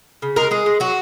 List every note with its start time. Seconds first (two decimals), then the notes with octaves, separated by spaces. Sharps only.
0.22 C#3
0.36 G#3 A#4
0.51 G#3 G#4
0.66 G#3
0.80 F#3 F#4